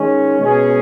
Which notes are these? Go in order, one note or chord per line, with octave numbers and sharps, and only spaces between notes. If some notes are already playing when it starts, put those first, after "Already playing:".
Already playing: D#3 G#3 C#4
B2 G#3 C#4 G#4